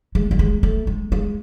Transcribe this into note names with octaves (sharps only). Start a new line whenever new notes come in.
G#3
G3
G#3
A3
G#3
G#3